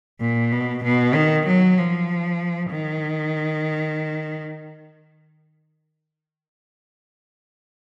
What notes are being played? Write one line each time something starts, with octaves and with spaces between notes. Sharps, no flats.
A#2
B2
B2
D#3
F#3
F3
D#3